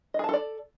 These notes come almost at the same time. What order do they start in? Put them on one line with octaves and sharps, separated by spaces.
D#5 G#4 A5 A4 D5